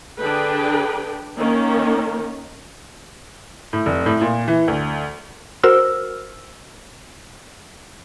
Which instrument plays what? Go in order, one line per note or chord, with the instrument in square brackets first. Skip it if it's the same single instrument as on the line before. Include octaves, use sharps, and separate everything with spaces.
[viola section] D3 D4 G#4 B4 G5
D#3 A#3 C#4 A#4
[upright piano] A2
F1
A2
A#2
E3
D2
[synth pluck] F#4 A#4 C5 E6 F6